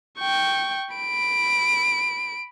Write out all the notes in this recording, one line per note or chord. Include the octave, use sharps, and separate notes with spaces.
G5 C#6
B5 D7